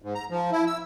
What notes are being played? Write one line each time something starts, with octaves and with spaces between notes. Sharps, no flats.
G#2
A#5
F3
E4
E6